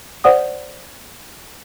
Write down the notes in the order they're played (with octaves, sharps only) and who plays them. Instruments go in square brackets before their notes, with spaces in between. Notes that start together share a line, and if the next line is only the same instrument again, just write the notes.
[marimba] C5 D5 F#5 D#6